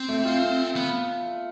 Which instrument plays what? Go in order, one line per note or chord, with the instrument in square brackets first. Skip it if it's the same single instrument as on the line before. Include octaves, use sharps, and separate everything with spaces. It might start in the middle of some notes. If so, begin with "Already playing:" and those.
Already playing: [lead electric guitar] C4
[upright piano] A3
F4
[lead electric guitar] B3